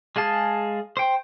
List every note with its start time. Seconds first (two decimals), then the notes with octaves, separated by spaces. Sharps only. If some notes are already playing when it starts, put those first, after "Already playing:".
0.16 G#3 G#4 F5 A5
0.97 C5 G5